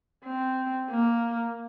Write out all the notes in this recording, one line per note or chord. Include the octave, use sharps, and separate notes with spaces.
C4
A#3